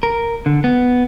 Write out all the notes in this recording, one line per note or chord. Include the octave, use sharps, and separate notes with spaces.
A#4
D3
B3